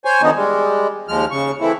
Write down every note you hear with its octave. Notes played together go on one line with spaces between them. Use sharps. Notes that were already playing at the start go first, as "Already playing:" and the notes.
C5 C#5 G#5
D3 D#3 F3 B3 D#4
G3 G#3
D#2 F3 G#3 F6
C#3 C#6
E3 A3 C4 E4